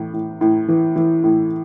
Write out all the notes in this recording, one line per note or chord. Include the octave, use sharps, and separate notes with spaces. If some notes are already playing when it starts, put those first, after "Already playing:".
Already playing: A2 E3
A2
A2
E3
E3
A2